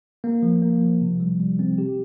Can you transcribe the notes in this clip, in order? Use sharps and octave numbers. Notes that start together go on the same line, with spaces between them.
A#3
F3
A#3
F3
C3
G3
G3
C4
G4